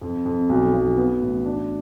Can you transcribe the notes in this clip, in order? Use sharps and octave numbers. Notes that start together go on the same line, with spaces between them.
F2
F2
B1
B1
B3
A1
D4